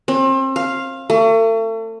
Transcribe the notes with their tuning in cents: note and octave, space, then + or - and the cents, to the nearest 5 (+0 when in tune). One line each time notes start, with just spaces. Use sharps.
C4 +35
F5 -5
A3 +40